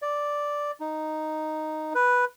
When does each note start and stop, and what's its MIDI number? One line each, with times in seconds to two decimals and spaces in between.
0.02 0.71 74
0.80 1.93 63
1.95 2.25 71